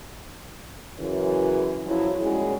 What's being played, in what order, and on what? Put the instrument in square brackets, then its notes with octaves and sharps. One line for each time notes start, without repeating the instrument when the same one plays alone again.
[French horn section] F#2 C#3 E3
C#3 F3 F#3 E4
D#2 G3 G#3 C#4 F#4 G#4